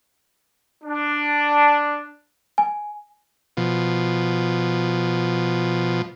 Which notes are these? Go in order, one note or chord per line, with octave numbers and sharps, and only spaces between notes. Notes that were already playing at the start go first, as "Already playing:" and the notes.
D4
G#5
B2 F3